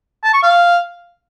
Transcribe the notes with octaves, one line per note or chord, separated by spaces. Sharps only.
A5
C#6
F5